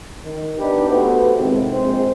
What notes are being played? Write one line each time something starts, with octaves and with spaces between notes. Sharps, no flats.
D#3
B3 D4 D#4 G4 B4
A3 B3 F#4 G4 B4 C5
A2 C3 D#3 F3 G#3 C4
A#1 G#3 C4 C5